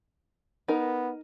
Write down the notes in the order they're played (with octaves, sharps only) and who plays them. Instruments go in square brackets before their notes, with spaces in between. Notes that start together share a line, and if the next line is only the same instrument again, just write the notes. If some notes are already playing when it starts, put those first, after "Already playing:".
[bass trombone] B3 [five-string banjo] D#4 A#4